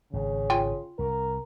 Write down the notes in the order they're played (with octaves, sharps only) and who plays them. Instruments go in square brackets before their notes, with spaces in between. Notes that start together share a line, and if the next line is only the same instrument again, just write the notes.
[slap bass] G#1 [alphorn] C#3
[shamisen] F4 G5 G#5
[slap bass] C2 [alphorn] A#4